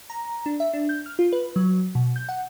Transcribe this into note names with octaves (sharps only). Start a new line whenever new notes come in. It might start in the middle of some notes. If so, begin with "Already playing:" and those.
A#5
D4
E5
D4
G6
F6
F4
B4
F#3
B2
G6
F#5